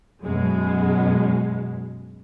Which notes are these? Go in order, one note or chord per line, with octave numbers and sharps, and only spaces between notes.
F#2 B2 G#3